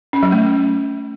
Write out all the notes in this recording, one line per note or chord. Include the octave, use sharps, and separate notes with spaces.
C#4
F#3
A3